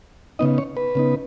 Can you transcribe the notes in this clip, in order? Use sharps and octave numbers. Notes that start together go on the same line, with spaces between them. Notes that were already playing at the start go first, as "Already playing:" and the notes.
C#3 B3 D#4 D#5
C#5
B4
C#3 B3 D#4